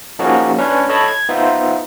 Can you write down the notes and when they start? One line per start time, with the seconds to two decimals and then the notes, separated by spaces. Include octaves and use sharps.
0.19 F3 A#3 C#4 D#4 F#4 G#4
0.58 C#4 D4 B4 C#5
0.89 A4 C#5 D#5 A5 B5 D#6
1.08 G#6
1.29 B3 D#4 F4 C5 E5